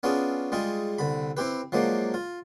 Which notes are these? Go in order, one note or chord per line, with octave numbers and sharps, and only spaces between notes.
B3 C#4 D4 F4 G#4
G3 G#3 F4 G#4
C2 D3 B5
C4 E4 G4 B4
F3 F#3 G#3 A#3 D4
F4